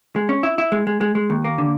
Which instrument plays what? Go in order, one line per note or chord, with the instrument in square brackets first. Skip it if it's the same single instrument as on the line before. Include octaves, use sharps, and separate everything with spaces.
[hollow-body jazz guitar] G#3
C#4
E4
E4
G#3
G#3
G#3
G#3
D#2
A#3
D3